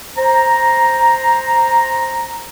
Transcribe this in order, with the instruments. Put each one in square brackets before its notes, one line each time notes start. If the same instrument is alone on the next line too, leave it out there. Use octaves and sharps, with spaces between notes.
[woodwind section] C5 A#5